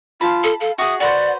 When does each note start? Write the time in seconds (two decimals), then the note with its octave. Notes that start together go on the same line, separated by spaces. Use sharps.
0.21 F4 A5 B5
0.44 A4
0.60 A4 F5
0.78 F#4 G#4 E5 D#6
1.00 F#4 B4 C5 D5 F#5